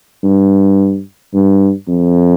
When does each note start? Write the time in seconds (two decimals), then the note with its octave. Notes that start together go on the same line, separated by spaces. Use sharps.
0.23 G2
1.34 G2
1.88 F2